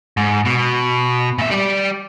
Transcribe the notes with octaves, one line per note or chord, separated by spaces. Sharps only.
G#2
B2
A#2 E5
G3 D5